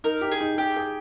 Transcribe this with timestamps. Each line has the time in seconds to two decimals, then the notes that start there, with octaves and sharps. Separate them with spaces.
0.04 D#4 A#4
0.21 G4
0.32 G#4
0.41 D#4
0.58 G4 G#4
0.76 G#4